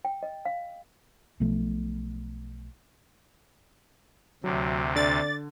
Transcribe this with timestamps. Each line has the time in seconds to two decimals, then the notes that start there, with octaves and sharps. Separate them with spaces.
0.05 G5
0.23 D#5
0.45 F5
1.40 B1 B2 F3 A3
4.44 D2 C3 F#3
4.96 D3 D5 A6